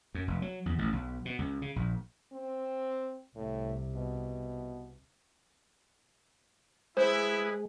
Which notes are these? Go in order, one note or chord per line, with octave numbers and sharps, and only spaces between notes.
F#2
F1
F#3
E2
A1
B1
B2
C#2
C#3
A#1
C4
C2 A2 C3
B2
G#3 E4 G#4 B4 C5